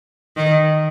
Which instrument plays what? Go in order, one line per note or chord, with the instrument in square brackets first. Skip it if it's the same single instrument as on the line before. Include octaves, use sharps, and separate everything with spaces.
[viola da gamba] D#3